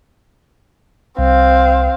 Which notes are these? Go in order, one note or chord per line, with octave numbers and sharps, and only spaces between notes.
C2 C4 F5